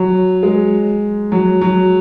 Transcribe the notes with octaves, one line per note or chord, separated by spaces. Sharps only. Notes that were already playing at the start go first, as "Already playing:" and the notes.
Already playing: F#3
G#3
F#3
F#3